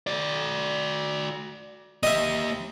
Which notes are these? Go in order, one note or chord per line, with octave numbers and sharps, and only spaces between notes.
F#4 D5
A#3 G4 D#5 E5